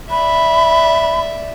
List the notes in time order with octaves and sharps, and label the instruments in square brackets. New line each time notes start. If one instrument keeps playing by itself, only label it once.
[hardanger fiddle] D5 E5 [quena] B5